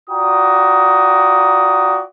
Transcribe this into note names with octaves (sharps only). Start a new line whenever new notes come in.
F4 F#4 D5 G5 A#5 D#6